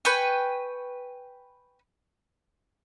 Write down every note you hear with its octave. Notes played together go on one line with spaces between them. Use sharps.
B4 G5 G#5 C#6